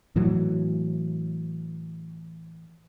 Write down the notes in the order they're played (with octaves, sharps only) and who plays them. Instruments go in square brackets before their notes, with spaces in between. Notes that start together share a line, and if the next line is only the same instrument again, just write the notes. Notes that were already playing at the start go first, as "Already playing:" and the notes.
[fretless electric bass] A2 E3 F#3